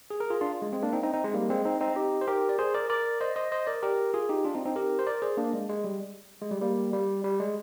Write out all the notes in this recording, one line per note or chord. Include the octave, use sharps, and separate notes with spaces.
G#4
A#4
F4 G#4
D4 F4
G#3
G#3 C4
A#3 D4
C4 D#4
C4 D#4
C4 D#4
G#3
G3 A#3
G#3 C4
C4 D#4
C4 D#4
D#4 G4
C5
G4 A#4
D5
G#4 C5
A#4 D5
A#4 D5
C5 D#5
C5 D#5
C5 D#5
A#4 D5
G4 A#4
F4 G#4
D#4 G4
D4 F4
C4 D#4
C4 D#4
G4 A#4
C5
A#4 D5
G#4 C5
A#3 D4
G#3
G#3
G3
G#3
G3
G3 A#3
G3
G3
G#3